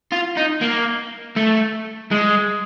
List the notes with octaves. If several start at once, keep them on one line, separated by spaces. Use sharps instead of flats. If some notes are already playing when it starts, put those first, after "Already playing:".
F4
D#4
A#3
A3
G#3